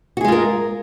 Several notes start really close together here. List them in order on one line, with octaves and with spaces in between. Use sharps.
F#4 G#4 G#3 F4 A#4